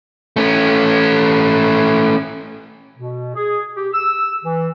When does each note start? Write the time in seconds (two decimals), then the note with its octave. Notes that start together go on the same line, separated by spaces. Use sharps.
0.36 A3 C#4
2.98 B2
3.35 G#4
3.75 G4
3.92 E6
4.43 E3